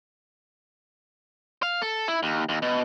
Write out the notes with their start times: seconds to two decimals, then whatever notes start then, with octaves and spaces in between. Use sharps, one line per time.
1.63 F5
1.82 A4
2.08 E4
2.23 D#2
2.49 D#2
2.62 B2